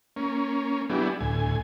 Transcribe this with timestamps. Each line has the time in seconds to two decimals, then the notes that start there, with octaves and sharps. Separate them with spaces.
0.16 A#3 C#4
0.90 F#3 B3 D4 E4 G4 G#4
1.20 D2 A2 G#5